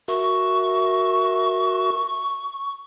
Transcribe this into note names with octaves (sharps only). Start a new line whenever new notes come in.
F#4 A#4 E5 C#6